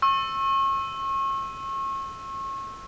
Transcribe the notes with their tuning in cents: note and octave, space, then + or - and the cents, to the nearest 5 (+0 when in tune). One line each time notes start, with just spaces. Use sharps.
C#6 -35 E6 +0